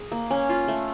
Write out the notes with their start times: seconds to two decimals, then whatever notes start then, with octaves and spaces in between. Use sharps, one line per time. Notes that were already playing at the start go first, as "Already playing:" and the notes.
Already playing: G#4
0.12 A#3
0.31 C#4
0.49 F4
0.68 A3